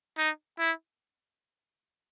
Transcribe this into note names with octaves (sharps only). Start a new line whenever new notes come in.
D#4
E4